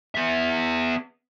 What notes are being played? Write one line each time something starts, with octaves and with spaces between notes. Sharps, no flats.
B3 E5